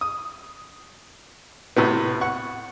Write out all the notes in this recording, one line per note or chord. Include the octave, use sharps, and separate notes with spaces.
D#6
A2 C3 B3
F#5 C#6